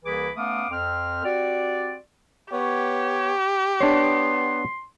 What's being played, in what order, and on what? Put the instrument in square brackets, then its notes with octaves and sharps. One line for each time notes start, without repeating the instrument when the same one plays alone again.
[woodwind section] C2 E3 A#3 G#4 B5 D6
A3 B3 C#4 F5 D6 D#6
F2 C4 F6
C4 F#4 G4 D5
[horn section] B3 C#5 [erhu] G4
[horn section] B3 [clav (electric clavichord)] D4 C#5 [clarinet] C6